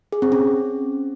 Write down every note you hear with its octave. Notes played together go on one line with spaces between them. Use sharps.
G#4
C4
C#4